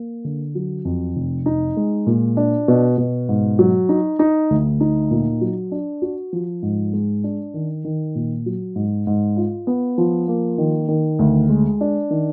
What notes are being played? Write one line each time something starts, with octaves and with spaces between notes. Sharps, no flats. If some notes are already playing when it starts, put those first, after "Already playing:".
Already playing: A#3
D3
F#3
F2
F1
D#4
G#3
A#2
D4
B2
B2
G#2
F#3
D#4
D#4
D2
D#4
A#2
F#3
D4
F#4
F3
G#2
G#3
D4
D#3
D#3
A#2
F#3
G#2
G#2
F4
B3
F3
A#3
D#3
D#3
D2
G#3
D4
D#3